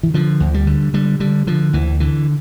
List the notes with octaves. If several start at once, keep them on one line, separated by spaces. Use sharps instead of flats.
E3
D3 F3
D2
G3
D3
D3 G3
D3 G3
D3 F3
D2 E3
D3 E3